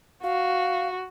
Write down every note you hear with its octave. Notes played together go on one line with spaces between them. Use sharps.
F#4 F5